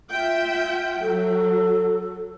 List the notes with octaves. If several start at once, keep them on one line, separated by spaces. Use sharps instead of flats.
F4 E5 G5
F#3 A4